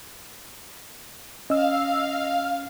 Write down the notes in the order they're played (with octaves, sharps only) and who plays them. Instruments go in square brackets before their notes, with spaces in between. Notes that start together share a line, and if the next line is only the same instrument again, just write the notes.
[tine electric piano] C#4 [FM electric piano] D#5 E6 [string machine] F5